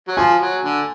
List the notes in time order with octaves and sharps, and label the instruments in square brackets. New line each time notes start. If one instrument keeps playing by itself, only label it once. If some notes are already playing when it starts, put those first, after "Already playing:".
[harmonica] F#3
[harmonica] F3 [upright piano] G#5
[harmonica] F#3
D3